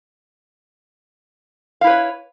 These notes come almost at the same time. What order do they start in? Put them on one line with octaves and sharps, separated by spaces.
F5 E4 B4 C#5